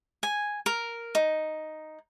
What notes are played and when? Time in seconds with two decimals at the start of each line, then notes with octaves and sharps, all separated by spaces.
0.23 G#5
0.66 A#4
1.15 D#4